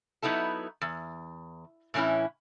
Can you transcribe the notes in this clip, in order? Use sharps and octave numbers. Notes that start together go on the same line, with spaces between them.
F#3 B3 D#4 E4 A4
E2
A2 E3 C4 C#4 E4